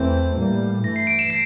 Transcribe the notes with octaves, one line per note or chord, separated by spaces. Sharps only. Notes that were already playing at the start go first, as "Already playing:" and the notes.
Already playing: E2 E3 A3 C4 G6
A2 G3 A#3
G2 E3 A3 A#6
C7
D7
E7
C7